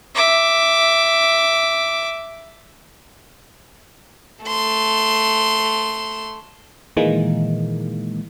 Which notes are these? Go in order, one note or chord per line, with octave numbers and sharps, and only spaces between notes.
E5 D6
A3 C6
A#2 D#3 E3 G#3 A#3